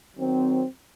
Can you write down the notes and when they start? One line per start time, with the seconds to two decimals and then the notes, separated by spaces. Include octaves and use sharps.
0.17 D#3 F#3 C4